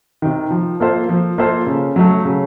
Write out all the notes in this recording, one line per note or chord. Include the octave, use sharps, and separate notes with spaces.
C3 D#3
F3
A#3 F4 A4 C5
F3
A#3 F4 A4 C5
C#3
F#3 A3
C#3